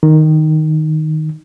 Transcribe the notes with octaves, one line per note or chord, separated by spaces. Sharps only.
D#3